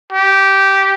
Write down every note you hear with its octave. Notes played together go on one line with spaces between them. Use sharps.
G4